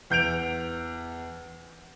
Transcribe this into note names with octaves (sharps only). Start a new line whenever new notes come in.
E2 G6 D7 F7